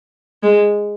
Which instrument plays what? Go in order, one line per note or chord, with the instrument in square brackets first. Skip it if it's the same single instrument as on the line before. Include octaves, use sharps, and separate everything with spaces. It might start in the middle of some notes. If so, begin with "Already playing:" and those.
[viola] G#3